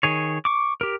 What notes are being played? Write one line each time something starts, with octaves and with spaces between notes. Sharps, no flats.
D#3 G#4 C#5
C#6 D6
G4 A#4